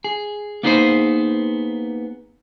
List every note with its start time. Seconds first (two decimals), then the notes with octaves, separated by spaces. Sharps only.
0.04 G#4
0.63 A#3 B3 D#4 G#4 B4 C5